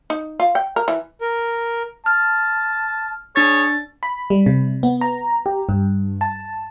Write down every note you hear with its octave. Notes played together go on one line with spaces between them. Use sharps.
D#4
F4
G5
A#4
E3
A#4
A5 F6
D4 G#4 C#5 A6
B5
G3
C3
B3
A#5
G4
G2
A5